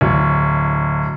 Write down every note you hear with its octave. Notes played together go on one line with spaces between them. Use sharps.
D1